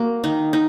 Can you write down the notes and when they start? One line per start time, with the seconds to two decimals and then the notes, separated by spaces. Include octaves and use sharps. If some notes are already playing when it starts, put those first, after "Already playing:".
Already playing: A#3 F#4
0.24 D#3 D#4
0.53 D#4